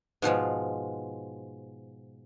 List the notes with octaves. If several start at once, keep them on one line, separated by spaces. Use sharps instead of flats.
G#2 B2 F3 G#3